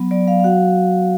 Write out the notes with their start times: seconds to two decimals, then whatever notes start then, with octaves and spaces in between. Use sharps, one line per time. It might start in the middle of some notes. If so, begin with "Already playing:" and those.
Already playing: F#3 B3
0.11 F#3 D5
0.27 F#3 F5
0.40 F5
0.44 F#4 F#5